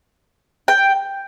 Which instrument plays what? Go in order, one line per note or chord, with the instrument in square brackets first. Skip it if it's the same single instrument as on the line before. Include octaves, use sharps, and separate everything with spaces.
[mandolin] G5